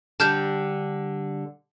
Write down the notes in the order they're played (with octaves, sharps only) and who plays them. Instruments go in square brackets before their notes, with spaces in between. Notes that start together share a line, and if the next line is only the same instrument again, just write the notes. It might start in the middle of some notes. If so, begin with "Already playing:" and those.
[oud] D3 G3 [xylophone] A5 F6 G6